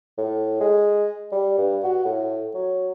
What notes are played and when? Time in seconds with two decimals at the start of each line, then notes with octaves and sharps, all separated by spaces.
0.18 A2
0.60 G#3
1.32 G3
1.58 G2
1.83 F#4
2.05 A2
2.54 F#3